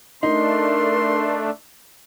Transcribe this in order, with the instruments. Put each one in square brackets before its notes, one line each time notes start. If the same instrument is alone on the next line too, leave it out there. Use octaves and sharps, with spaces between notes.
[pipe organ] A3 D4 [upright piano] D#4 [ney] A#4 [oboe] C6